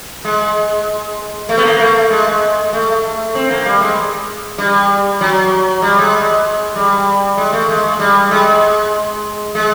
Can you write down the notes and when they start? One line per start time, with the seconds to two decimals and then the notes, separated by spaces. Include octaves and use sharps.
0.25 G#3
1.49 A3
1.58 B3
1.65 A#3
1.80 A3
2.10 G#3
2.73 A3
3.35 C4
3.50 A#3
3.66 G3
3.81 G#3
4.58 G3
5.21 F#3
5.82 G3
5.98 G#3
6.76 G3
7.37 G#3
7.53 A3
7.68 G#3
8.00 G3
8.31 G#3
9.55 G#3